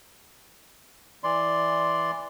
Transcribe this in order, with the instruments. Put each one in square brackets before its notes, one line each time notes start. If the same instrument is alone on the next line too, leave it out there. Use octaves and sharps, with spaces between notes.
[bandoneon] E3 D5 C6